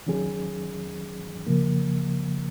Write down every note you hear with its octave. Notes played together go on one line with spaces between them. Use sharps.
D#3 F#3 C#4 G#4
C#3 F3 A#3